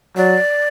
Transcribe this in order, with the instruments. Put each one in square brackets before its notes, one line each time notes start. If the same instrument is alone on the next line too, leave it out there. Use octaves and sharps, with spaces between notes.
[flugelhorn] F#3 [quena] D5